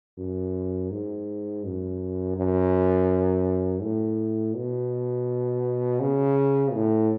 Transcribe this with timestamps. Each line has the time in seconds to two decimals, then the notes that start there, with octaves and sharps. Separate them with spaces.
0.18 F#2
0.91 G#2
1.64 F#2
2.36 F#2
3.82 A2
4.55 B2
6.00 C#3
6.73 A2